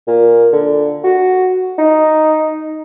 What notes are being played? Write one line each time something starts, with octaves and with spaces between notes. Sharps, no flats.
A#2
D3
F#4
D#4